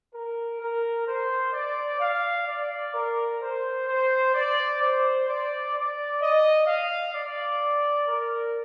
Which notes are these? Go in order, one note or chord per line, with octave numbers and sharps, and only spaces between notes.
A#4
A#4
C5
D5
F5
D5
A#4
C5
C5
D5
C5
D5
D5
D#5
F5
D5
A#4